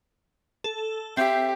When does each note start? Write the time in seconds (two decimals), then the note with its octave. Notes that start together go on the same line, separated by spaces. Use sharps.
0.64 A4
1.17 C4 G4 E5